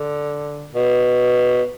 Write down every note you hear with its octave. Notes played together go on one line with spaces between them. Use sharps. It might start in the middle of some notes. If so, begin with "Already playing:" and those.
Already playing: D3
B2